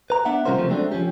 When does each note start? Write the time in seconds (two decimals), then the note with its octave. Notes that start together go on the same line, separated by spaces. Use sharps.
0.10 B4 A#5
0.25 B3 D4 E5 F#5
0.45 C3 G3 C#4 F4 A#4 C5
0.58 C#3 F3 A3 C4
0.70 F#3 G#3 A3 C4 D4
0.92 F3 C#4 G4